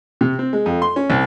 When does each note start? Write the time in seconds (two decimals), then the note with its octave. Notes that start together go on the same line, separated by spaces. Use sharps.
0.21 C3
0.39 C4
0.53 G#3
0.66 F2
0.82 C6
0.96 C#4
1.10 C2